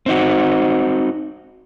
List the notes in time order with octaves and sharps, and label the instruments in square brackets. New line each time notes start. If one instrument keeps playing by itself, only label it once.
[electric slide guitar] C4 D#4 F#4